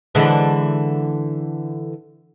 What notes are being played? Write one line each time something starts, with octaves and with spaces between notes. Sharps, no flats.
D3 E3 G#3